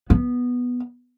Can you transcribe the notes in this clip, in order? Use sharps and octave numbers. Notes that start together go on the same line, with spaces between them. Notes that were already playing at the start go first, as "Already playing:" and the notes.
B3